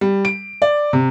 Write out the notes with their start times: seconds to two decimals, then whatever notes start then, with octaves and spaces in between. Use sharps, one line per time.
0.01 G3
0.25 D7
0.62 D5
0.93 C3